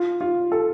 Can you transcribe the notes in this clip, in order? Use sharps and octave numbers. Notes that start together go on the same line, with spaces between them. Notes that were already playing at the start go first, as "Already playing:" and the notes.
Already playing: F4
F4
A4